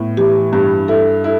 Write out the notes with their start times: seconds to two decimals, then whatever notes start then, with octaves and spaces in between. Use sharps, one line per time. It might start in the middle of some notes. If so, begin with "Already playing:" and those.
Already playing: A2 B3
0.17 E3 G4
0.53 G2 G4
0.88 E4 A4
1.24 E4 A4